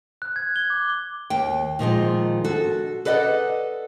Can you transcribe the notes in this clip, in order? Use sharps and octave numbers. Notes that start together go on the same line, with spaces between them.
F#6
G#6
G7
D6
D#2 G5
A#2 D#3 F3 G#3
D4 F#4 A4
A4 B4 D5 D#5 F#5